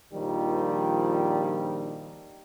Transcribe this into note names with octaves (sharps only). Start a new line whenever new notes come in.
A#1 D#3 F3 G3